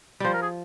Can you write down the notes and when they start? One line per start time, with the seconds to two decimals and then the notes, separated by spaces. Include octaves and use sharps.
0.20 F3 G3 C5
0.34 A#4
0.42 G#4